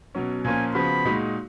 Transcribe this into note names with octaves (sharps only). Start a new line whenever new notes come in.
B2 F#3 C#4
A#2 F3 A#3 C#4 G#5
C#3 F3 B3 F#4 B5
A#2 G#3 D#4 F#4